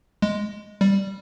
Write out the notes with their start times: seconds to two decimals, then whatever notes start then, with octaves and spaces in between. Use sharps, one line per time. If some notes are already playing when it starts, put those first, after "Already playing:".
0.22 G#3
0.81 G3